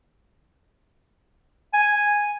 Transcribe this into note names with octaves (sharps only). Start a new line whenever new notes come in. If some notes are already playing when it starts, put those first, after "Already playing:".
G#5